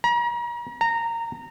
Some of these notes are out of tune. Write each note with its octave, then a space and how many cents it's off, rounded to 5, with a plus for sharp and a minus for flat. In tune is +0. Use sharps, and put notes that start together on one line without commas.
A#5 +40
A#5 -15